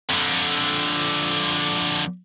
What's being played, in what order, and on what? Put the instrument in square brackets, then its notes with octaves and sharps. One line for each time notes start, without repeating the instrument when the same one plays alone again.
[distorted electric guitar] F2 D3